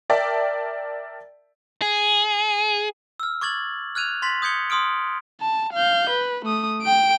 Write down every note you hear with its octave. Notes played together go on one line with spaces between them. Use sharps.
A#4 D5 E5 G5 A5
G#4
E6 F6
C#6 D6 G#6 A6 F#7
F6 F#6 G#6 D#7 F7
C6 A6 B6 F#7
D#6 G6 G#6 C#7 G7
C6 D#6 F6 D7
A5
F5 G6
B4
A3 D#6
G5 D7